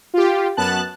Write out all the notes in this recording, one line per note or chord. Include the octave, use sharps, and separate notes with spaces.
F4 G4
F#2 B3 A5 F#6